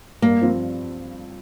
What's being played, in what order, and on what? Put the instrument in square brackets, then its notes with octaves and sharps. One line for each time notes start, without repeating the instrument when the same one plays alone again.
[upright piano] G2 [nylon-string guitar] A#3
[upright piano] F3 C4 F4